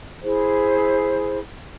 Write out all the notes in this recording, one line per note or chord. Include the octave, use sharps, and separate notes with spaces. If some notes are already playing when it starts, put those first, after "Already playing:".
E4 G#4 C5